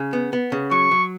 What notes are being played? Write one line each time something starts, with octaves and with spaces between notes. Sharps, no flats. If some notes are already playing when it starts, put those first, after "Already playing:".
Already playing: C#3
B3
B3
C#3
F#3 C#6
F#3